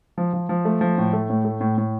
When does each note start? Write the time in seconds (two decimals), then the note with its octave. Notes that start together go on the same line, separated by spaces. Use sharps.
0.18 F3
0.33 F3
0.49 F3
0.65 A3
0.81 F3
0.98 A2
1.13 A3
1.30 A2
1.45 A3
1.61 A2
1.78 A2